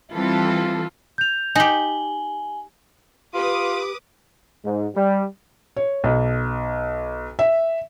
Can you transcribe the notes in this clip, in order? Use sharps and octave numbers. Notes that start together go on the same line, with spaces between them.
E3 G3 C4 F4 A4
G6 F7
D#4 G4 G#5 F#7 G7
F4 G4 B4 D6 D#6
G#2
G3
C#5
B1
E5